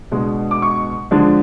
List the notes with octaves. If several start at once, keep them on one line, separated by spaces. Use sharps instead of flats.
B2 G#3 D4
D6
C#6
D3 F3 G#3 D4